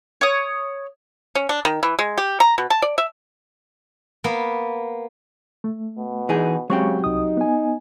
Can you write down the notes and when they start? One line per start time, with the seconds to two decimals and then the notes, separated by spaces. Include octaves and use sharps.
0.21 C#5 D#6
1.35 C#4
1.49 D4
1.65 D#3
1.83 E3
1.99 G#3
2.18 G4
2.40 A#5
2.58 B2
2.70 A5
2.82 D5
2.98 E5
4.24 A#3 B3
5.64 A3
5.98 B2
6.29 E3 D#4 G#4
6.70 C#3 F#3 G#3 C4 G4 C#6
7.04 C2 D#4 D#6
7.37 B3 G#5